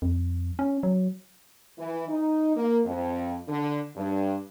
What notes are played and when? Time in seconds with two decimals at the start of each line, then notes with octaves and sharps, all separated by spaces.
0.02 F2
0.59 C#4
0.83 F#3
1.79 E3
2.08 D#4
2.57 A#3
2.85 F2
3.48 D3
3.96 G2